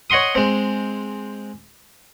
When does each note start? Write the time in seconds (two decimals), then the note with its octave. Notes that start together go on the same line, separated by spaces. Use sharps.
0.10 C#5 D#5 F#5 C6 D#6
0.35 G#3 C4